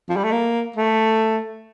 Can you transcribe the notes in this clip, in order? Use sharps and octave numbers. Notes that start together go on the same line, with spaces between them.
F3
G3
A3
A#3
A3